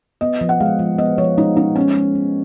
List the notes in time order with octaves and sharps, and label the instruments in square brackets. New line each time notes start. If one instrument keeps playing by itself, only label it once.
[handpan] B3 [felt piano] D#5
[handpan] F3
[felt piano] F#5
[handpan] G#3 [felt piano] F5
[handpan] F3
[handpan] B3 [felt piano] D#5
[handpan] F3 [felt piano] C#5
[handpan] G#3 [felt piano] D#4
[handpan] F3 [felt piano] D#4
[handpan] B3 [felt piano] C#4
[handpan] G#3
B3